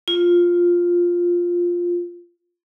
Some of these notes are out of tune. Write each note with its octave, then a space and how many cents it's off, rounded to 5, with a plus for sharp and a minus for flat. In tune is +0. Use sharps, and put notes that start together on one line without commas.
F4 +5